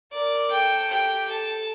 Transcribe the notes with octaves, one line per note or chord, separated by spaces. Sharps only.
A#4 D5
A4 G5
G4 G5
A4 A5